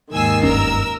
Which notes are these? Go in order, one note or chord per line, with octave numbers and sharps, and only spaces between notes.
D#2 G#2 D#3 G#5 E6 C7
F#1 G2 C#4 A#4 E6